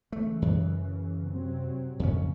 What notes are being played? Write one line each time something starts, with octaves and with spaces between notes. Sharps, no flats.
C#3 E3 A3
F#2
C3 F#3 C4
A#1 F2 G#2 C#3 C#4